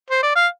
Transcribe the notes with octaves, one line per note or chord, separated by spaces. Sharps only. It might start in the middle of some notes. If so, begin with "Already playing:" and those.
C5
D5
F5